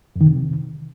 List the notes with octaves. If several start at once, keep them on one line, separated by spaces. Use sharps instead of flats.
F2
D#3
C3